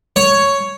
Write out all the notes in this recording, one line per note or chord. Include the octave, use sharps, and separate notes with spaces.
C#5